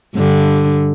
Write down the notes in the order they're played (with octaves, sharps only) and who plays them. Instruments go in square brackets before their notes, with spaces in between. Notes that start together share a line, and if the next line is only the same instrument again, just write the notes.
[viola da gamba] G2 D3